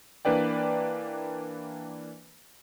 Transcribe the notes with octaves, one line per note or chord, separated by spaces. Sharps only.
E3 A#3 D4 B4 D5 G5